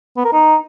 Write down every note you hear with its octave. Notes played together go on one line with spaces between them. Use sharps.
B3
A#4
D#4